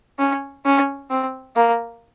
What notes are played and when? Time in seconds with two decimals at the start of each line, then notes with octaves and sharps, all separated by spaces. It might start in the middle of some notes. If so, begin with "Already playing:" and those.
0.19 C#4
0.65 C#4
1.10 C4
1.56 A#3